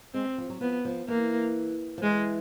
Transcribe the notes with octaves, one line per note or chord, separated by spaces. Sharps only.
G#3 C4
F3
F#3
F3 B3
F3
E3 A#3
F3
E3 G#3